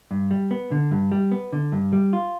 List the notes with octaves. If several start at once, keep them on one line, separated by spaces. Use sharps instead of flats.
G2
G3
B3
D3
G2
G3
B3
D3
G2
G3
F4